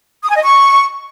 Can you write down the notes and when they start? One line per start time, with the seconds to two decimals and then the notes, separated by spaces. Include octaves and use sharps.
0.23 D#6
0.30 G#5
0.36 D#5
0.42 C#6